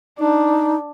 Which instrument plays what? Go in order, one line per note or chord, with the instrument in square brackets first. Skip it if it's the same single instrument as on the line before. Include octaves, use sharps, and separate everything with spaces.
[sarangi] D4 [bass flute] D#4